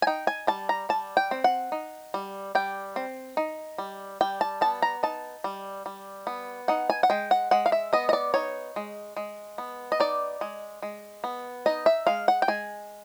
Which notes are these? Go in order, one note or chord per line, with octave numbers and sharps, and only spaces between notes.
G#5
D#4 G5
G#5
G3 A5
A#5
G3 A5
G5
C4
F#5
D#4
G3
G3 G5
C4
D#4
G3
G3 G5
A5
B3 A5
A#5
D#4 A5
G3
G3
B3
D#4 F#5
G#5
F#5
G#3 G5
F#5
G#3 F#5
F5
E5
B3 D#5
D#5
D5
D#4 C#5
G#3
G#3
B3
D#5
D#4 D5
G#3
G#3
B3
D#4 D#5
E5
G#3 F5
F#5
G5
G#3 G#5